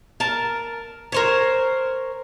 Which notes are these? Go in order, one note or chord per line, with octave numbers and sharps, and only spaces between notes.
A#4 A5
A#4 C5 C#5